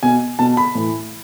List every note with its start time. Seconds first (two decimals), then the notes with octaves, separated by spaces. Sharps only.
0.03 B2 G#5
0.39 B2 A5
0.57 B5
0.75 A2 E3